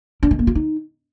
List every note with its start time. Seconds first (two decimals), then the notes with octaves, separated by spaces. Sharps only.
0.23 D4
0.31 G#3
0.39 A#3
0.47 F4
0.55 D#4